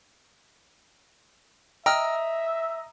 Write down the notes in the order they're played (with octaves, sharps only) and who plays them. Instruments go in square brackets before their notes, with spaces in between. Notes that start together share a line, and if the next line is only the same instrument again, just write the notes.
[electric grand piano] D#5 A#5 [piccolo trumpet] E5 [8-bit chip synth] G5 E6 F6